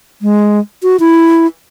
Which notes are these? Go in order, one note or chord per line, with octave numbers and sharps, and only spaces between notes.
G#3
F#4
E4